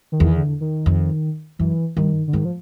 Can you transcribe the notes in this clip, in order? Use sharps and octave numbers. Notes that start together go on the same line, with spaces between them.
D#3
E2
D3
D#3
F2
F#2 E3
G2 D#3
D3
G#2 D#3
F3